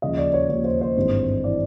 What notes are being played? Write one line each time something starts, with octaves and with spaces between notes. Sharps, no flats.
D#2 C#3 F3 D#5
D5
C#5
D#2 C#3 F3 C#5
C5
C5
G#1 G2 E3
E3 D5